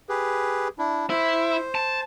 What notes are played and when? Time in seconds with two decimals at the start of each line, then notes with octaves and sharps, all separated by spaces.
0.09 G4 G#4 B4
0.79 D4 E4
1.10 E4 C5
1.75 A5